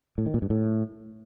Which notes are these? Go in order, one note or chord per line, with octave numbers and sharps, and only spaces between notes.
A2
D#3
A#2
G2
A2